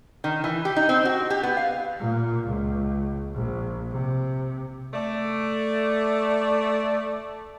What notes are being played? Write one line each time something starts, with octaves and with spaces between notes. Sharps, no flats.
D#3
E3
G4
D#4
C4
F#4
G4
B3
F5
A#2
C#2
A#1
C3
A3 D5